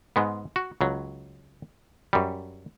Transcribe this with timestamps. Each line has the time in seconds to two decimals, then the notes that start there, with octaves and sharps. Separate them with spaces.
0.16 G#2 G#3 B3
0.56 F#4
0.81 C#2 F#3
2.13 F#2 G3